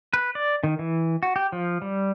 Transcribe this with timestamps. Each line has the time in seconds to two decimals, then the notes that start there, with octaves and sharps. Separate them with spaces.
0.13 B4
0.35 D5
0.64 D#3
0.79 E3
1.23 F#4
1.36 G4
1.52 F3
1.82 G3